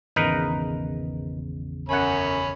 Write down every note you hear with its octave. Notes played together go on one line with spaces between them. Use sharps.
G#1 E2 C#3 D#4 A#4 B4
F#2 C#4 F#5 G#5 B5